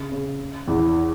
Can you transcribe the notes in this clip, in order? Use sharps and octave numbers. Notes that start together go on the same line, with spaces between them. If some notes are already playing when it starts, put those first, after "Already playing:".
Already playing: C#3
C#3
E2 E3